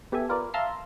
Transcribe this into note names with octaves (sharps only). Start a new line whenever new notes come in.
B3 G4 A4 E5 G#5
F4 A#4 B4 D5
E5 F5 A5 A#5 C6